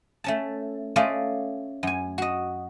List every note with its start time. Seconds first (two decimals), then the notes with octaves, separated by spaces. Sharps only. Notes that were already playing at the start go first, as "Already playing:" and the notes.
0.24 A3 C#4 A5
0.96 A3 C#4 F4 D5 D#5 F5
1.83 F#2 G#5
2.18 F#4 D#5